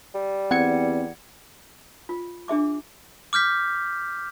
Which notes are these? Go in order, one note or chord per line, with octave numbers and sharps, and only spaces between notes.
G3
E2 C4 F#5 G#6 C#7
F4
D4 G#4 E5 D6
D6 F6 G6 B6